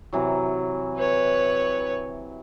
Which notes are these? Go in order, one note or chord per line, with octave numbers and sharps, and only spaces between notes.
C3 E3 F#3
B4 C#5